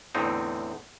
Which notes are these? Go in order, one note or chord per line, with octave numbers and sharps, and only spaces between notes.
E2 A2 D3 C4 D#4